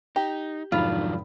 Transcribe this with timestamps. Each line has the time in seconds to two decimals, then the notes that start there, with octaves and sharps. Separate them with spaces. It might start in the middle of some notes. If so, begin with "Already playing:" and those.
0.16 D#4 G4
0.72 F1 G#2 D#3 F#3 D4 F4 B5